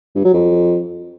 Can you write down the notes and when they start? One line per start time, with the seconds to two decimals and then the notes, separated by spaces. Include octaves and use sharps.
0.16 G2
0.25 F#3
0.34 F2